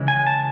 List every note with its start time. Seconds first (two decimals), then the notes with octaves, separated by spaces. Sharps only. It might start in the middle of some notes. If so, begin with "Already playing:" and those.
Already playing: C#3 E3 G#3 C#4
0.08 G#5
0.27 A5